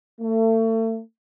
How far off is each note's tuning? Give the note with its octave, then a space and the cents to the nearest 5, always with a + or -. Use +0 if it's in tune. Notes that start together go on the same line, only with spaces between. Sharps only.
A3 +35